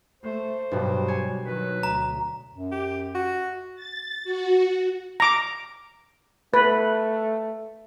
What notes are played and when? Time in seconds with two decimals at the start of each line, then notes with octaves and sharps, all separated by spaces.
0.23 A3 C5
0.71 G2 B2 F#3 G3
1.08 C#5 G#5
1.43 D#3 F#3 B4
1.83 D2 A#5
2.54 F#2
2.72 G4
3.15 F#4
3.75 A6
4.23 F#4
5.20 A#5 D6
6.54 A3 B4